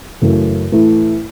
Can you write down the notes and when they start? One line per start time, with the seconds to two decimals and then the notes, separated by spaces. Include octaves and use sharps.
0.21 F#2 C#3 E3 A3
0.72 A2 E3 A3 E4